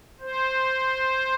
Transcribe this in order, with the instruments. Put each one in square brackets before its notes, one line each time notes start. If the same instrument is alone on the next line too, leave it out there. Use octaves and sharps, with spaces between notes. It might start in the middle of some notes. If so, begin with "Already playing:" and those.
[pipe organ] C5